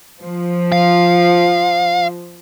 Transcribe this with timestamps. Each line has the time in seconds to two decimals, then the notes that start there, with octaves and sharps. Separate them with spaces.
0.22 F3
0.72 F5